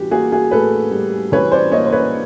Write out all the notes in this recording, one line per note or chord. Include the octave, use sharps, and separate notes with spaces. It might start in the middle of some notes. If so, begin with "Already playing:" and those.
Already playing: A2 E3 G3 F#4 G4
A#3 F#4 G#4
F#4 G#4
A2 A4 B4
G3
E3 B4 C#5
C5 D5
A#3 C#5 D#5
C5
B4 C#5